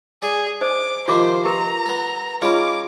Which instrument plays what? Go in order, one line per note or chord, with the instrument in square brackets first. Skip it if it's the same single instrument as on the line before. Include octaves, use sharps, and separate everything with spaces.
[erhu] G#4 [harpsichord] D5
[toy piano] C5 D#5 [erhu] D6
[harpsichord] C3 D#3 F3 [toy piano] F4 D6 [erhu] C5
[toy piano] G4 A#4 B4 [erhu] A#5
[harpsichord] B3 A4
[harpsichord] C#4 D#4 F4 [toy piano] G#4 B5 [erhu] D6